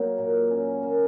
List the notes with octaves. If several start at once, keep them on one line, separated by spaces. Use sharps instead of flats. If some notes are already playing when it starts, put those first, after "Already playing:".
Already playing: F#3 A#3
A#2
C#4
A#3